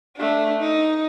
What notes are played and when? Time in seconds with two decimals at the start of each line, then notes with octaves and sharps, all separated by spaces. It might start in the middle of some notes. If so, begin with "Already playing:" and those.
0.17 A3 D4
0.60 D#4